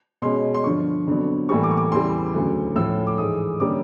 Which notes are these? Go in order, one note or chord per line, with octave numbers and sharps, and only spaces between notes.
B2 G#3 C#4 C6
C6
G2 D3 F3 C#6
F2 D3 F#3 B3 D4
A2 E3 G3 A#3 C#6
D6
C#6
D6
E2 C#3 E3 G3 C6
D2 C#3 F#3 A3
A2 F3 A3 C#4 E6
D6
G#2 E3 G#3 D#6
D3 G3 A#3 C#4 D6